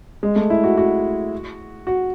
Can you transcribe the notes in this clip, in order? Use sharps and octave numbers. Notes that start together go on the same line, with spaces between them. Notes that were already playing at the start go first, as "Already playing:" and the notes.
G#3
A3
E4
F#4
F#4
F#4